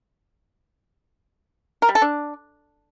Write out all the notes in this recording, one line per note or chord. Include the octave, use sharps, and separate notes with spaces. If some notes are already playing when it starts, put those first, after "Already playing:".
A#4
G3
A4
D4